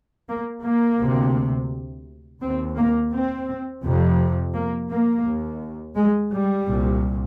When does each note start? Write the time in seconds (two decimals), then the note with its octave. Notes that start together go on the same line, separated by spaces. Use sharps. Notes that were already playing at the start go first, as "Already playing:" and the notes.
0.28 A#3
0.64 A#3
0.99 D2 C3
2.41 D#2 C4
2.77 A#3
3.12 C4
3.83 F2 C3
4.54 A#3
4.90 A#3
5.25 D#2
5.96 G#3
6.31 G3
6.67 C2 A#2